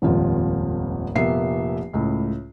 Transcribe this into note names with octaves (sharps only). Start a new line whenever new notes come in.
D#1 G#1 F2 F4
F1 A#2 A#3 B3 E5 C7
C#2 A2